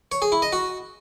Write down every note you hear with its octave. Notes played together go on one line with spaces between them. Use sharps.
C#5
G#4
E4
D#5
F#4